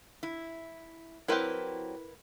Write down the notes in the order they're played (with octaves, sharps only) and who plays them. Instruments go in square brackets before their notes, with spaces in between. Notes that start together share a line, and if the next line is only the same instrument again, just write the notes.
[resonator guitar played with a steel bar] E4
[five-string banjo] F#3 C4 G4 [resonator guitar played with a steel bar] E4 A#4 B4